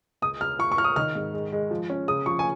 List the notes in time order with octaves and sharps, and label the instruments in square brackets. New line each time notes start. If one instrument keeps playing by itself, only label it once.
[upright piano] C#2 [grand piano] D#6
[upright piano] C#2 [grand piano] F6
[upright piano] F4 [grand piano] C#6
[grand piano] C#6
[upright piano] F4 [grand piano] F6
[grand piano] D#6
[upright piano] D#3 [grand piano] F6
[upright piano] G#2
G#3
G#3
F3
C#4
[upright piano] C#3 [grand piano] D#6
[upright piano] F3 [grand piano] C#6
[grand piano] G#5